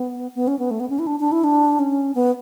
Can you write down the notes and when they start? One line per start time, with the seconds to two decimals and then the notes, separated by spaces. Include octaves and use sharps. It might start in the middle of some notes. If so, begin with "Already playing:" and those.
Already playing: B3
0.35 B3
0.47 C#4
0.59 B3
0.71 A3
0.80 B3
0.89 C#4
0.99 E4
1.07 D4
1.20 D4
1.32 E4
1.44 D4
1.79 C#4
2.15 B3